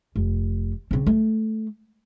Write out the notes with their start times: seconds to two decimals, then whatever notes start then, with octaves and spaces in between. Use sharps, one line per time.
0.16 F1
0.91 C#3 C4
1.07 A3